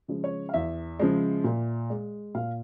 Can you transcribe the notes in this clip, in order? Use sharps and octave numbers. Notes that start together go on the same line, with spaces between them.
C#3 F3 G#3
C#5
F5
E2 E5
C#3 F3 G#3
A#2
G#3
A#2 F5